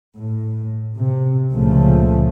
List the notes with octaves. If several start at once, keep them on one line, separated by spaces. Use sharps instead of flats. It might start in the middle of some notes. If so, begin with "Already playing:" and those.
A2
C3
C#2 A#2 C#3 F3 A3